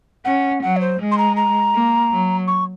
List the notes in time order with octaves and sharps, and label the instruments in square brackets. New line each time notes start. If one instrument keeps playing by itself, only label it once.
[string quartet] C#4 [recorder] F#5
[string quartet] F#3 [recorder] F#5
[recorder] C#5
C5
[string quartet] G#3
[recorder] C6
A#5
A#5
[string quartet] A#3
F#3
[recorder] C#6